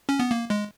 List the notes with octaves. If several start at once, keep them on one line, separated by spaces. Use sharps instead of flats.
C#4
B3
A#3
G#3